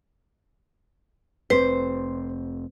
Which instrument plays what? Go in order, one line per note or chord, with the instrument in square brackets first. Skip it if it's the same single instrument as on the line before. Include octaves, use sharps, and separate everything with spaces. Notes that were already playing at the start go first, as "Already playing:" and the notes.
[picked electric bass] F1 C4 [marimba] B4 [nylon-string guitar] C5